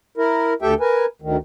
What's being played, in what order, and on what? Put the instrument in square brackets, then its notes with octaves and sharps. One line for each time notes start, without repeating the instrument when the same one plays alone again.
[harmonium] E4 A#4
D2 A3 G4 A4 E5 G5
A#4 B4 G#5
D2 D#3